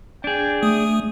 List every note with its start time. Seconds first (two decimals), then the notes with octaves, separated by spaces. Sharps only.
0.24 D4 G#4 G5
0.63 A3 D#6